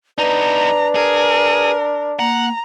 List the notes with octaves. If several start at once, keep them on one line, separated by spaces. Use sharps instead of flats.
B3 D4 D#4 B4 A#5
G#4 A#4
A#3 F#5 A#5